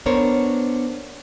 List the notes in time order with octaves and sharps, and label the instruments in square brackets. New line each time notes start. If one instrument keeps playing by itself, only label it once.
[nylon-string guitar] B3 D4 A#4 C5 C#5